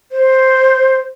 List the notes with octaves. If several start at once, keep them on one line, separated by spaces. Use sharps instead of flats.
C5